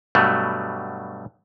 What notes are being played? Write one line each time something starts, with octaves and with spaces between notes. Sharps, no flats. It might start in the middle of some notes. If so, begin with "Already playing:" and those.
G2 B2 F#3 G3 A3